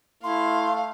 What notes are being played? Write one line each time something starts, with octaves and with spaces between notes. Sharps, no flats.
A3 E4 F5 C6